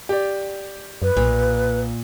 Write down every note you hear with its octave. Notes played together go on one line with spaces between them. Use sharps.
G4 D5
F#2 B4
B1 A#2